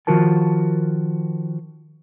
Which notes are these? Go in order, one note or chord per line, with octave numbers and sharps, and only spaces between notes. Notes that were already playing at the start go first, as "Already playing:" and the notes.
D#3 F3 F4 F#4 A#4 A5